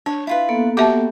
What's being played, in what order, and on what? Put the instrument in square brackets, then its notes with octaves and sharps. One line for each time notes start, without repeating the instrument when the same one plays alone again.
[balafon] D4 [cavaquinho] C#5
[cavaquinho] E4 F4 B4
[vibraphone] A#3 B3 A4
[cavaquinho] F#4 G5 [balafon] G4 E5 A5